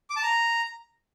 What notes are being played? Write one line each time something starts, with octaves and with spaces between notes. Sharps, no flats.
D6
A5
A#5